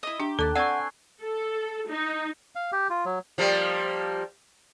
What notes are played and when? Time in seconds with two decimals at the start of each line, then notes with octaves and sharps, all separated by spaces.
0.03 E4 D#5
0.20 D4 G4 A#5
0.39 D#2 A4 A5 D6 F#6 A6 G7
0.56 C4 D5 F#5 G#5 C#6 C7
1.22 A4
1.89 D#4
2.55 F5
2.72 G4
2.90 F4
3.05 F#3
3.38 F3 G3 A#3